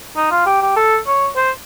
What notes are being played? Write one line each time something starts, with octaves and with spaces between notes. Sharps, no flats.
D#4
F4
G4
G4
A4
C#5
C5